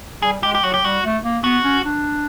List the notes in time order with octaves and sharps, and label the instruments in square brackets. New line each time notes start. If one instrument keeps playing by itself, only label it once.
[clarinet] G3 [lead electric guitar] G#4
[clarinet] G#3 [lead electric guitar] G4
[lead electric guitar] G4
[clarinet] F#3 [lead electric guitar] F#4
[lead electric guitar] G4
[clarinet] G3 [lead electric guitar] F#4
[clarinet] A3
A#3
[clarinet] B3 [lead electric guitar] F#4
[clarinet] C#4
D4